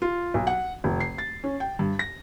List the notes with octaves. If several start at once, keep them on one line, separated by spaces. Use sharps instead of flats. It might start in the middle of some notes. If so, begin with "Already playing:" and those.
F4
B1
F#5
F1
C7
A6
C#4
G5
G2
A#6